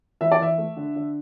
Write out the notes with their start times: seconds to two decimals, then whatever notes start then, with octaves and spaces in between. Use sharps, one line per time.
0.21 E3 E5
0.32 D5
0.40 E3 E5
0.58 A3
0.77 D3
0.96 D3